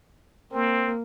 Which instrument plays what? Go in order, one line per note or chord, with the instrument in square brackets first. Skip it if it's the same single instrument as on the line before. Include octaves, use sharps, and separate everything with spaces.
[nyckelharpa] A#3 [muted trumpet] C4